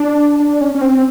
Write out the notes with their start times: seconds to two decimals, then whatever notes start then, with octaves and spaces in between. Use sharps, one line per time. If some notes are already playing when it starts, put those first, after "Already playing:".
Already playing: D4
0.40 D4
0.61 C#4
0.75 C#4
0.81 C4